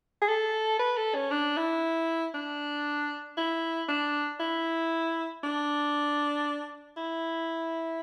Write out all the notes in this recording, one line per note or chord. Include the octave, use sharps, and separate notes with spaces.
G#4
A4
B4
A4
C#4
D4
E4
D4
E4
D4
E4
D4
E4